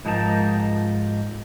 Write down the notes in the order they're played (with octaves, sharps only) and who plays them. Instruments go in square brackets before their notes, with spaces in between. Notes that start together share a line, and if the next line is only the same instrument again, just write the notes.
[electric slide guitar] G#2 F3 D#4 G4 A#4 A5